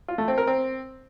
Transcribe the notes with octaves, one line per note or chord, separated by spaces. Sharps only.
F4
A3
C4
A#4
C4